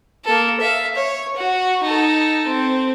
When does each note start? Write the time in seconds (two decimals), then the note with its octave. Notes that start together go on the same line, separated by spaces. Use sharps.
0.25 A#3 A4
0.60 E5 F5
0.96 C#5
1.37 F#4
1.83 D#4 A4
2.47 C4